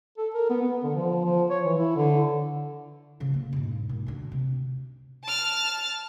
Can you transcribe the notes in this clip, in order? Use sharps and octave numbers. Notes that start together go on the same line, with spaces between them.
A4
A#4
B3
B3
D3
F3
F3
C#5
E3
E4
D3
C#3 F3
A#3
E1 G#2
A#2
D2 D3
C3
A5 F6